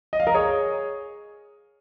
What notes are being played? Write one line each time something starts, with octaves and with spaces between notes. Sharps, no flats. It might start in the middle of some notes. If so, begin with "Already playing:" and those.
D#5
F5
A#4 D#5
G#4 C#5